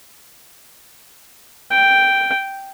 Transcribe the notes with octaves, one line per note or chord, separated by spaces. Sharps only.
G5